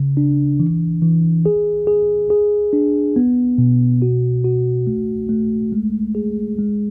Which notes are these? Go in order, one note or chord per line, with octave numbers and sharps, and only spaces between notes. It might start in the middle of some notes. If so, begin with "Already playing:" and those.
Already playing: C#3
D4
E3
E3
G#4
G#4
G#4
D4
B3
B2
F#4
F#4
A3
A3
G#3
G#4
G#3